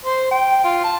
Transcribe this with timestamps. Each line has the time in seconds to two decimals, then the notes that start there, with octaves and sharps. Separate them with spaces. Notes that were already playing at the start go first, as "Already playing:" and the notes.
0.05 C5
0.31 G5
0.64 F4
0.84 A5